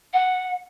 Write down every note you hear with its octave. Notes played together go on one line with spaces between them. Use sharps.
F#5